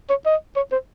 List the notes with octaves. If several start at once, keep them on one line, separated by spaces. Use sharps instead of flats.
C#5
D#5
C#5
C5